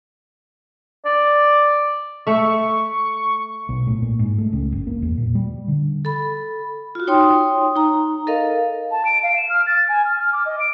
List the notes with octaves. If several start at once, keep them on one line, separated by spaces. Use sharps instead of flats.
D5
A3 E5 C#6
B1
A2
A#2
G#2
A3
C#2
G1
A#3
E2
A#2
G3
D3
A4 B5
F4 F#4
D#4 C#5 G5 C6 D#6
D#4 A#5
A4 A#4 D#5 F5
A5
D7
F5
E7
F6
A6
G#5
F6
F6
D6
D#5
D7